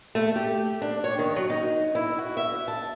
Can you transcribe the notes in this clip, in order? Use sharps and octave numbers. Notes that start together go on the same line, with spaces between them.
A3
G4
D4
C#5
D#3
F#3
D#4
E4
F#4
E5
A5